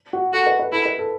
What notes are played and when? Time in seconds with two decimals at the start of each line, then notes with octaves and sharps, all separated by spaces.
0.13 F#4
0.33 F#4 A4
0.46 B4
0.59 B4
0.72 E4 A4
0.85 B4
0.99 A4